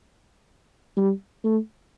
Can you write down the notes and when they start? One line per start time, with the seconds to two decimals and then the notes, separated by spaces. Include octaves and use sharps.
0.97 G3
1.44 A3